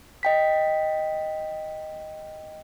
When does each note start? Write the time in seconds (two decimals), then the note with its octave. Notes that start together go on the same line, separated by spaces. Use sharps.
0.23 D#5 G5 B6